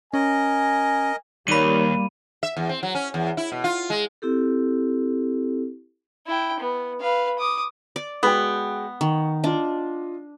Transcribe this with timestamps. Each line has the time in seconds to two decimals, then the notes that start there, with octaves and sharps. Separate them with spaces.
0.14 C#4 A#4 D#5 G#5
1.48 D#2 G3 A#3 D#4 A#4 C#5 B5 D#7
2.43 E5
2.56 E2
2.69 C4
2.83 F#3
2.95 C#4
3.14 E2
3.37 E4
3.52 B2
3.64 F4
3.90 G#3
4.22 C4 E4 G4 A4
6.27 E4 G5
6.60 B3
7.01 B4 F5
7.39 D6 D#6
7.96 D5
8.23 G#3 B3 F#4 G5
9.01 D#3 C#6
9.44 D4 F4 D#5